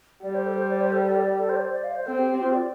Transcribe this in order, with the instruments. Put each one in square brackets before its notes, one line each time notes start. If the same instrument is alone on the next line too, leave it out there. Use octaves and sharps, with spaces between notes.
[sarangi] G3 [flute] D5
[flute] C5
A4
C5
D5
C5
A4
A4
D5
A4
C5
D5
C5
D5
F5
C5
[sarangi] C4 [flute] A4
[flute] G4
G4
F4
D5